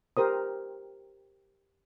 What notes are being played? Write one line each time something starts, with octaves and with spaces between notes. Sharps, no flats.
G4 A#4 C5 D#6